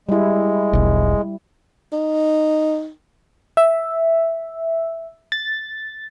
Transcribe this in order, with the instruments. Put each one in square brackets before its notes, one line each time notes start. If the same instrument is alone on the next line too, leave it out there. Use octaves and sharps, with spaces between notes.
[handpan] G3 E4 [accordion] G#3
[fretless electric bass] E1 B1
[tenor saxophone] D#4
[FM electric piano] E5
A6